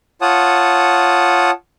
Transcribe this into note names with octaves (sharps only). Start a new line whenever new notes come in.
F4 C#5 F#5 A5 D#6